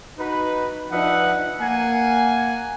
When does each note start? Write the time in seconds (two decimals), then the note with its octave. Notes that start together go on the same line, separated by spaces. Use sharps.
0.18 D#4 F#4 B4
0.91 F3 D4 D#4 B4 E5 F#5
1.60 A#3 F#5 G#5